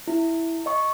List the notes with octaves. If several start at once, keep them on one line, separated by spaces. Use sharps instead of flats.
E4
D#5 C#6